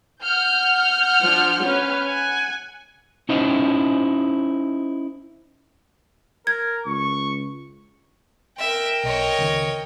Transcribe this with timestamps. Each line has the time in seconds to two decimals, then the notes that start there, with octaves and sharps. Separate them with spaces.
0.21 F#5 F6 G6
1.21 F3 D4
1.63 C#4 B4
2.05 F#5 G#5
3.29 C#4 D#4 E4 C5 D#5
6.47 A#4 G#6
6.86 C#2 C#6
8.59 A#4 E5 G5
9.03 B1 C#5 D#5
9.39 C#2 D#3